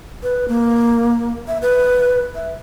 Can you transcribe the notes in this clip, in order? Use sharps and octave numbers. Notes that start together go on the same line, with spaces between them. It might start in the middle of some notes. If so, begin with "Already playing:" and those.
B4
A#3
E5
B4
E5